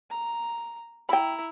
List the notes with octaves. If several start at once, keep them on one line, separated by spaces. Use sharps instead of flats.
A#5
E4 G5 A#5 B5